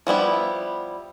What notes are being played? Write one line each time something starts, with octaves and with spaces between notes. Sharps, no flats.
F3 G3 B3 E4